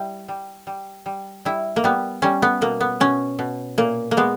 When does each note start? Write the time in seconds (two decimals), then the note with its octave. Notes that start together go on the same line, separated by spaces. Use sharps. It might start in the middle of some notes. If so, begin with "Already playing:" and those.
Already playing: G3 E4 G4
0.28 G3
0.67 G3
1.06 G3
1.45 G3 E4
1.76 A#3
1.84 G3 B3
2.22 G3 C#4
2.42 B3
2.61 B2 A#3
2.80 B3
3.00 B2 C#4
3.39 B2
3.78 A#2 A#3
4.11 A#3
4.17 G#3 B3